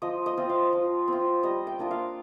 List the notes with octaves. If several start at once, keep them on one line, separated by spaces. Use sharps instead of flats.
F3 D#5
D#5
C4 F4
F5
F3
C4 F4
G3 D#5
G5
A#3 D4 F4
F5